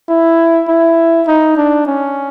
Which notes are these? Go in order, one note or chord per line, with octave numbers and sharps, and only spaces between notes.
E4
E4
D#4
D4
C#4